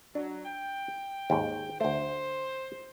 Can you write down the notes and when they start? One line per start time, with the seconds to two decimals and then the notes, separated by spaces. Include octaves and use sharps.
0.15 F#3 D4
0.45 G5
1.30 D#2 G#2
1.81 D2 A3 C5